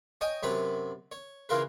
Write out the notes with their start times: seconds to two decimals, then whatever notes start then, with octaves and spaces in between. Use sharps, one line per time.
0.21 C#5 D#5 G5 G#5 D#6
0.43 F#2 C3 B4 C#5 B5
1.12 C#5
1.49 C#3 E3 F4 A#4 B4